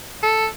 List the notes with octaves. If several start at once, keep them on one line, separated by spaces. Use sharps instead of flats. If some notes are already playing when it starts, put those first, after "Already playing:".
A4